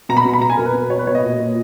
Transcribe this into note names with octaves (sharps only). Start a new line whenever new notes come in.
B2 A#5
B5
B2
B5
B2 A#5
G#5
B2 A#4
B4
B2
B4
B2 C#5
B4
B2 C#5
D#5
A#2
A#2